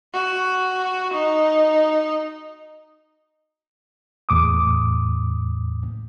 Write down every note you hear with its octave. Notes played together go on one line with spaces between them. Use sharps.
F#4
D#4
E2 A2 D6 D#6